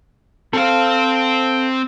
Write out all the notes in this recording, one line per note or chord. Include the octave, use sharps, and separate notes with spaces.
C4 A4 C5 F5